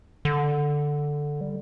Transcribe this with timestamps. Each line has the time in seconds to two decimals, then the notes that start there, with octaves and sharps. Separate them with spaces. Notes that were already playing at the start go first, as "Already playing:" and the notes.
0.25 D3
1.41 G3